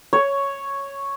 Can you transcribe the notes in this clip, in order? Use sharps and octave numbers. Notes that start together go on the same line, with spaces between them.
C#5